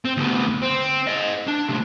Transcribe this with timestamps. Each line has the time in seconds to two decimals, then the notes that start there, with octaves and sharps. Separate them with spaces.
0.05 C4
0.17 D2 B3
0.62 C4
1.07 C5 D#5
1.48 D4
1.69 A2 C3